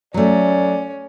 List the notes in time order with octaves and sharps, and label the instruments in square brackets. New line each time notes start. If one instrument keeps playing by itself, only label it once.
[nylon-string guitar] F#3 A3 [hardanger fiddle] C#4 [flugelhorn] D5